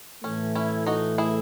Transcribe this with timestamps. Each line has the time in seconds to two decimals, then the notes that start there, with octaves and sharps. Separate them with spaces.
0.24 A2 E3 A3 C#4
0.55 C#4 E4
0.86 D#4 F#4
1.18 E4 G#4